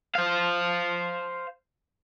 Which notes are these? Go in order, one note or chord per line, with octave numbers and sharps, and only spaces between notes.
C5 F5